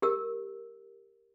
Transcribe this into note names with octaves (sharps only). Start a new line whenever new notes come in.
G4 A#4 E6